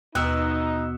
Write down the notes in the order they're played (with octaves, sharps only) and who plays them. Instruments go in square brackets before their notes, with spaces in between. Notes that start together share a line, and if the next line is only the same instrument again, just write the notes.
[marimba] D#2 [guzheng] B2 [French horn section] D#4 [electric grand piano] E6 F#6